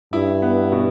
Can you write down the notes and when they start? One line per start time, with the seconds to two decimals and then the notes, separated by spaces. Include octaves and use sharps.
0.13 G2 E4
0.42 B3
0.72 B2